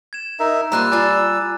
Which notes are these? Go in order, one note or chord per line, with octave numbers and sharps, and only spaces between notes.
G#6 E7
D#4 A#4 E5
C3 G3 A#3 F4 A#5 E6 F#6 D#7
F4 D5 G#5 D6 A6